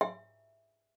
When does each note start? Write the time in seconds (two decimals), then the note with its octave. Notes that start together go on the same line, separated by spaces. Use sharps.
0.01 E5